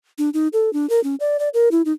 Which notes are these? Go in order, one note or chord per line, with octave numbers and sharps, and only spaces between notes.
D4
D#4
A4
D4
A#4
C#4
D5
D5
A#4
E4
D#4